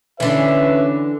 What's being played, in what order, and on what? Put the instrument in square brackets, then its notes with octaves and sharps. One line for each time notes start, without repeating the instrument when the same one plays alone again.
[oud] D3 E3 [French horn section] C#4 B4 [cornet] E5